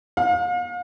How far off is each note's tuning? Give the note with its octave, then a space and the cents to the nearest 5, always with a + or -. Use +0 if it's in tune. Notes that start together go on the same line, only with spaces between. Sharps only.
F5 +40